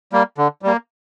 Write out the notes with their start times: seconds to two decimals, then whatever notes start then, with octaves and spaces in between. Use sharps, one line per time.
0.12 G3 A#3
0.38 D3
0.62 G3 A#3